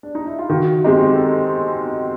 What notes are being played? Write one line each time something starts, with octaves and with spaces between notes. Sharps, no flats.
D4
D#4
E4
F4
D#3 F#4
G#3 C4 D#4 G4
A4